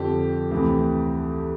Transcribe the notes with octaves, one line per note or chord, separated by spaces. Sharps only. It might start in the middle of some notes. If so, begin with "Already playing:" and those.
Already playing: F2 D3 F3 G4
D2 C3 E3